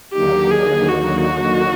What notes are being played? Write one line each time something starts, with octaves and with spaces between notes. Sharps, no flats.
D#2 D3 F#3 A#3 D#4 G4
G#4
F#4